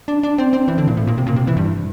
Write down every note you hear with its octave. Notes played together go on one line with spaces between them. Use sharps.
D4
D4
C4
C4
E3
D3
A#2
A2
A#2
C3
A#2
C3
E3
G2